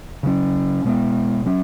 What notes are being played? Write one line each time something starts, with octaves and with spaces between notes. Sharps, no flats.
C#3 F#3 C#4
B2 G#3 B3
F#3 C#4